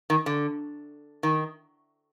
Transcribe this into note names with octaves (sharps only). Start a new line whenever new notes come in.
D#3
D3
D#3